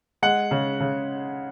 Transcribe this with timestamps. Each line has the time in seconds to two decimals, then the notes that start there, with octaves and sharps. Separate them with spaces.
0.22 G#3 F#5
0.51 C#3
0.80 C#3